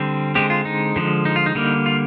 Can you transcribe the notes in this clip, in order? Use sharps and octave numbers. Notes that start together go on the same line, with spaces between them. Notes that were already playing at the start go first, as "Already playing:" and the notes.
Already playing: D3 G3 C4
D3 G#3 C4 G4
F4
D#4
D3 F3 G#3
D#4
F4
D#4
D3 G3 A#3
F4